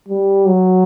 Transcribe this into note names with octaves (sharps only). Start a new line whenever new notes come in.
G3
F#3